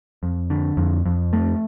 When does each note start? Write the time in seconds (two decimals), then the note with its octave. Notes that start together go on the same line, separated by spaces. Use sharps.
0.23 F2
0.50 D3
0.77 F2
1.06 F2
1.33 A3